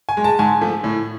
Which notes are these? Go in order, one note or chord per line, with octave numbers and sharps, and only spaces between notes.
G#5
G#3
A5
G#2 G#5
F3 A3
A2